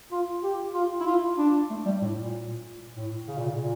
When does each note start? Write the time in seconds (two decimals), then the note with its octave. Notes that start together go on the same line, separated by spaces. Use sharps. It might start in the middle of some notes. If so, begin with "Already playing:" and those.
0.11 F4
0.43 G4
0.74 F4
1.00 E4
1.06 F4
1.38 D4
1.70 A3
1.85 G3
2.02 A2
2.17 A#2
2.97 A2
3.28 C#3
3.38 A#2
3.48 C#3
3.60 A#2